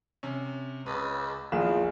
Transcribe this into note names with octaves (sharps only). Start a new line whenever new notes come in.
C3 C#4
C#2 B4
A#1 E2 F4 G#4 E7